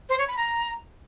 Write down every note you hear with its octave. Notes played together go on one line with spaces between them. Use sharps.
C5
C#5
B5
A#5